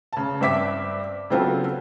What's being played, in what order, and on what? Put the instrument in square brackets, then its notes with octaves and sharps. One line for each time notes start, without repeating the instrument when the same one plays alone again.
[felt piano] C#3 A5
G2 C4 E5 D6 B6
C#3 F#3 B3 C4 F4 A4